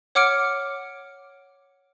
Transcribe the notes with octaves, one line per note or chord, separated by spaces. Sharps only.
C#5 F#5 D6 F6 C#7 D7